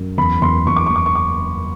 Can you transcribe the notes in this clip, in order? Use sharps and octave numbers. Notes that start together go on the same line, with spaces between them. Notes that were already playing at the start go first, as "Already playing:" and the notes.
Already playing: F#2
E2 B5
E2 C6
E2 C#6
D6
C#6
E2 D6
C#6
D6